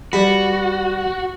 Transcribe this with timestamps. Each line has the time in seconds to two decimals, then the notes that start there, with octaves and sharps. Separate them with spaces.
0.13 G3 F#4 B4